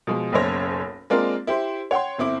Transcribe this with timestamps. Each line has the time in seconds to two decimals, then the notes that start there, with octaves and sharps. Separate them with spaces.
0.07 B2 F3 G#3
0.32 F#1 B1 F#2 C5 C#5 A#6
1.10 G#3 A#3 C4 D4 F4 A#4
1.47 E4 G4 C5
1.91 C#5 F#5 G5 C6
2.18 G1 C4 E4 D6